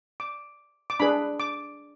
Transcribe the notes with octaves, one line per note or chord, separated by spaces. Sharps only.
D6
D6
D4 G#4 B4 B5
D6